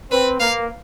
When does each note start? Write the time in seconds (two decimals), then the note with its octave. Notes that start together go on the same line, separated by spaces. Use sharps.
0.11 C4 B4
0.40 A#3 F5